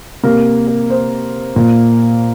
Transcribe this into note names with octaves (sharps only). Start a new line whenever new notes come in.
C3 A#3 A#4
A#4
C5
A#2 A#3